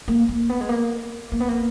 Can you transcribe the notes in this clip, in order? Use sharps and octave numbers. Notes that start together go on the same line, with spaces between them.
A#3
A#3
B3
G#3
A#3
A#3
B3
A#3